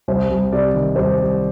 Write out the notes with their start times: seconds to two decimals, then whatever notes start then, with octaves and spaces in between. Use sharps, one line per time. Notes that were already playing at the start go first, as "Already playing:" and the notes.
0.08 C2 C5
0.30 C2
0.52 C3 D5
0.74 D#3
0.96 C2 C5
1.18 C2